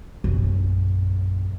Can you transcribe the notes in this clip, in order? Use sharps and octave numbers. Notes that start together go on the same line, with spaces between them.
A#1 F#2